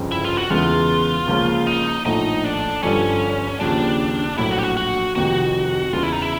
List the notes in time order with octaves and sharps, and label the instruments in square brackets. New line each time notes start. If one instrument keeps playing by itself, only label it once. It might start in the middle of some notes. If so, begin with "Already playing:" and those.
Already playing: [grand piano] G1 F2 C#3
[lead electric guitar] E4
F4
F#4
[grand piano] E2 C#3 E3 G#3 B3 [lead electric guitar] F4
[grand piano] C#2 C#3 F3 A#3 C#4
[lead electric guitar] D#4
[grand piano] A#1 A2 F3 A3 [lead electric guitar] D#4
[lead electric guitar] D4
[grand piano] G1 G2 D3 F3 [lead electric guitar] C#4
[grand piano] D#2 C#3 F3 [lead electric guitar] D4
[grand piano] A#1 A2 F#3 [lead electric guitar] E4
[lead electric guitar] F#4
G4
F#4
F#4
[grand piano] F1 F2 C3 D#3 [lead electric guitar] F#4
[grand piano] E2 C#3 E3 [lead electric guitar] F4
[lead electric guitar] E4
D#4
E4